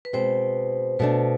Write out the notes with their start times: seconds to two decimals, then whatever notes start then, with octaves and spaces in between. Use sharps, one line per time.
0.05 B4
0.13 B2 G#3 C4 C5
0.99 B2 A3 D4 B4